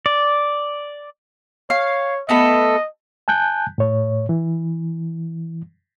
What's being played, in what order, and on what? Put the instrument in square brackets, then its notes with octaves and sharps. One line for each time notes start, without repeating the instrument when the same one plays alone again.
[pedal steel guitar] D5
[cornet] C#5 [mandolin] F5
[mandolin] A3 B3 A4 [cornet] D#5
[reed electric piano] G#5 A5 F#6 G6
A2 C#5
E3